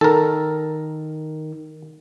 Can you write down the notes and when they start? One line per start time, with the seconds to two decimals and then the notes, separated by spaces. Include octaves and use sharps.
0.01 D#3 A4 A#4